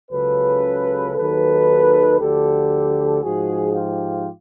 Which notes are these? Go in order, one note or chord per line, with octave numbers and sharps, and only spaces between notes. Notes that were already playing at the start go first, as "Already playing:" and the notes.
C#2 C#3 F#3 A4 B4
D#2 D#3 F#3 A4 B4
D2 D3 F3 G4 A4
G#2 F3 F#4 G#4
F4 G4